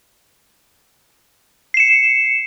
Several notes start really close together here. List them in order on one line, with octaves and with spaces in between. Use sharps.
C7 E7 C#7